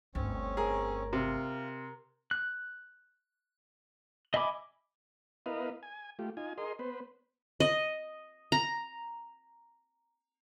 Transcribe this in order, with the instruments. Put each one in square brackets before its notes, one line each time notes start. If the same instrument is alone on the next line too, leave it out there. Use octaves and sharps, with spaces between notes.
[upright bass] G1 D2 [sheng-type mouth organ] C4 C#4 C#5
[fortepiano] G#4 [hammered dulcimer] A#4
[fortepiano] C3 [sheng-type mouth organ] F4
[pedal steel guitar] F#6
D#5 E5 G#5 B5 D6
[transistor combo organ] B3 E4 A#4 B4 D#5 F5
G#5
A3 F4 G4
D#4 F4 G#5
G#4 A#4 D#5 C6
B3 B4 C5
[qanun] D#5
A#5